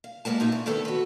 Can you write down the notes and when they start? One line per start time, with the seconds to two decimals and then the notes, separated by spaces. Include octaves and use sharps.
0.04 F5
0.25 B2 G#3 A#3 B3 A5
0.40 A#2 D#4 E5
0.52 C#3
0.66 D2 D3 D#3 B3 A4
0.85 F#4 B4